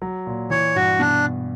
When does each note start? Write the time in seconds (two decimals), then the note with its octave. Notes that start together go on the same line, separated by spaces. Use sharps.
0.02 F#3
0.27 A#2
0.50 E3 C#5
0.75 G2 F#4
0.99 B2 D4